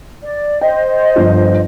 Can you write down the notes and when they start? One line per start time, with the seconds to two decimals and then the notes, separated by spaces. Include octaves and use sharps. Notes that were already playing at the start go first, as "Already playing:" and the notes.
0.23 D5
0.61 C5 D#5 G5
1.16 G1 F3